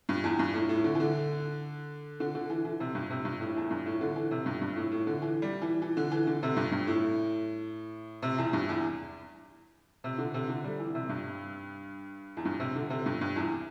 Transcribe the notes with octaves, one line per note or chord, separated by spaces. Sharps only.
G2
E2
G2
A2
A2
D3
E3
D3
D3
D3
E3
E3
C3
G2
C3
G2
A2
E2
G2
A2
D3
E3
C3
G2
G2
A2
A2
D3
E3
G3
E3
E3
D3
E3
D3
C3
G2
G2
A2
C3
E2
G2
E2
C3
D3
C3
D3
G3
E3
C3
G2
E2
G2
C3
D3
C3
G2
G2
E2